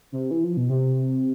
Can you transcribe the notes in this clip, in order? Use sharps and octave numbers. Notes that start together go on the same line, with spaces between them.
C3
E3
F3
B2
C3